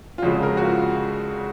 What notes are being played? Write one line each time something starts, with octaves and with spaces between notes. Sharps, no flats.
F4
F2 C#3 G#3 F#4
A#4
F#4
F4